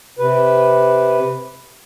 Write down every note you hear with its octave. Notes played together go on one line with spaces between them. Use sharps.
C3 B4